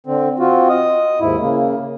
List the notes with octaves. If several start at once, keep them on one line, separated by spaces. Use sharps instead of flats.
D3 C4
C4 F4 F#4
D#5 D#6
D#2 G#2 E4
C#3 A#3